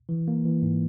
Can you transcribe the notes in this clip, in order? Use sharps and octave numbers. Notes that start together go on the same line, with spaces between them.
E3
A#3
E3
G#2